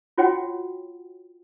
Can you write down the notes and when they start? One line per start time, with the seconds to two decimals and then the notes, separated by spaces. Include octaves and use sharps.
0.18 F4 F#4 C#5 F#5 G5